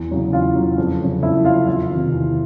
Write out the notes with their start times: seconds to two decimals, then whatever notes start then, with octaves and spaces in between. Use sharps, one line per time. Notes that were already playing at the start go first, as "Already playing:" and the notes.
Already playing: E2
0.11 C#3 F#3
0.33 E2 F4 F5
0.56 C#3 F#3
0.78 F2
1.01 C#3 F#3
1.22 F2 E4 E5
1.45 C#3 F4 F5
1.50 F#3
1.67 E2 F4 F5
1.90 C3 D#3
2.11 E2